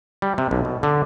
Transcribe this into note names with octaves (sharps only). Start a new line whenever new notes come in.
G3
C3
B1
B2
D3